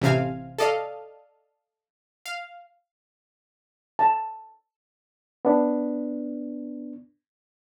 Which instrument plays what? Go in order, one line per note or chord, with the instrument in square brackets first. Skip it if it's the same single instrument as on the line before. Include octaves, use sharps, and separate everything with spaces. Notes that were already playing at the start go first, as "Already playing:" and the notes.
[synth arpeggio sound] A1 C3 C4 F5 G#5
A4 D5 D#5 F5
F5
[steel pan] A5
[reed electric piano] B3 D4